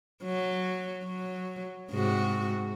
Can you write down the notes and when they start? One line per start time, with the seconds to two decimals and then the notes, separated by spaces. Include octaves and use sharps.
0.24 F#3
1.05 F#3
1.91 G#2 C3 F#4